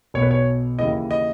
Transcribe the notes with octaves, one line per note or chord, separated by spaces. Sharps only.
B1 B2 C#5
B4
C#5
D#2 C#3 E3 D#5
D#5